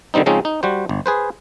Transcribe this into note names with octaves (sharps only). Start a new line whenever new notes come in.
D3 D#3 G3 C4 D#4
C#3 F3 G#3 C4 C#4 D#4
D#4
G3 F#4 C5
G1
G#4 B4 C5